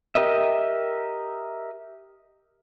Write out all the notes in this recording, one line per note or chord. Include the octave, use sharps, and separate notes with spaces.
G4 A#4 D#5 E5